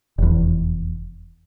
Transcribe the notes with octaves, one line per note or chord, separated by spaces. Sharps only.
F1 E2